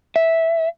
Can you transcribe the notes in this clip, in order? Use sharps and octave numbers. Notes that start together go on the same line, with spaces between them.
E5